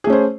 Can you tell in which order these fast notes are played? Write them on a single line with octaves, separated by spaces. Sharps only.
G#4 A3 C#4 C5